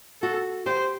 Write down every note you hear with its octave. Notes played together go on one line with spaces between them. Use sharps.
F#4 A4
G4 C5